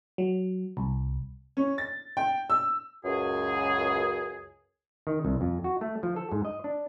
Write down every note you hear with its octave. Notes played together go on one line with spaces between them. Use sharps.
F#3
C2
C#4
A6
G5
E6
C#2 F#2 G#4
D#3
C2
F2
F#4
A3
F3
A4
G#2
D#5
D4